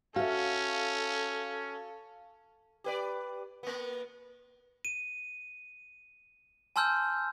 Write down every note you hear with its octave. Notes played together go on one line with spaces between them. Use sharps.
C#4 F#4 A4 E5 F5
G4 B4 D5
A#3 B3
D#7
G#5 A5 C6 E6 F6 G6